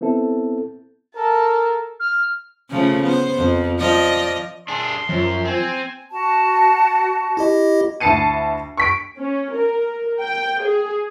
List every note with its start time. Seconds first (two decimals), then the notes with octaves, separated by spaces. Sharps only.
0.01 B3 C4 E4 A4
1.15 A4 A#4 A5
1.99 F6
2.70 C#3 F3 A3
3.03 B3 C5
3.37 F2
3.79 F3 D5 D#5
4.68 D4 G#4 C6
5.09 F#2 F3
5.45 C4 G#5
6.11 F#4 A5
7.37 E4 G4 D#5
8.00 D2 E4 A5 C7 C#7 D#7
8.77 C#6 B6 D7
9.17 C#4
9.54 A#4
10.21 G5
10.63 G#4